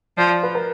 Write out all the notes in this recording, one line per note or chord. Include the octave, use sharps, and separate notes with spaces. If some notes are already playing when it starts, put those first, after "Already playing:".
F3 D5
D5
B4
A#4